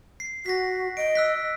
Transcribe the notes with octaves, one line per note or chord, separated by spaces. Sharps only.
C7
F#4 A#6 B6
D#5 D7
E6 F#6 B6